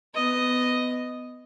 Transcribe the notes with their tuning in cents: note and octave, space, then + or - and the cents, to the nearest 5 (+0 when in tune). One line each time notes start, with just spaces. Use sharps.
B3 +20 D#5 +0